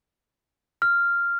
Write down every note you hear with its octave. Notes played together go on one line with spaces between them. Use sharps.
F6